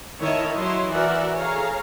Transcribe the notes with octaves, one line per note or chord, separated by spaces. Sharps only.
D#3 E4 C#5 D#5 A5
F#3 E4 C#5 D#5 C6
E3 F#4 A#4 D5 E5 F#5
G#4 A4 C#5 F5 A#5